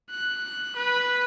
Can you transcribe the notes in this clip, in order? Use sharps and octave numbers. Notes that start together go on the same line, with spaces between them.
F#6
B4